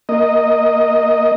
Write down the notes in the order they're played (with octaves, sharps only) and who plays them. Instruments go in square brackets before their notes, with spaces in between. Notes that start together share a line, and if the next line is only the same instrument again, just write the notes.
[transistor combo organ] A#3 D#5